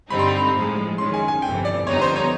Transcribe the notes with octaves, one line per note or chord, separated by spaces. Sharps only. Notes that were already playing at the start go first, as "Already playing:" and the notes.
G2 D3 G3 C4 D#4 B5
C6
B5
A2 F3 G#3
F#2 D#3 G#3 C#4 C6
G#5
G#5
G1 F2 C3 E3 G5
D5
F2 D3 G3 B3 D#4 C#5
C5
C#5